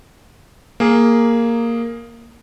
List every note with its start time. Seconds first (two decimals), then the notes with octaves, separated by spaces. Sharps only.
0.80 A#3 G#4